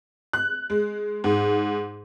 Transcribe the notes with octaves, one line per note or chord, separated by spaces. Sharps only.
F#6
G#3
G#2